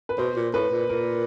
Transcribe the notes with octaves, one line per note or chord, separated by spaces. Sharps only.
B4
B2 C5
A#2
A2 B4
A#2
A#2 A#4